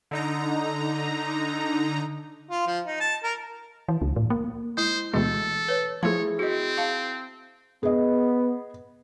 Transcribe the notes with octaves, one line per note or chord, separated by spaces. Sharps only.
D3 D#4 A#5
F4
F3
D#4
A5
A#4
E3
C#2
A2
A#3
G#3 E4 C5
D2 B2 E3 G#3 A4
B4 C#5
F3 A3 E4 G#4 C#5 C6
C4 F#4 D#5
F5 A5
B3 G#4 D#5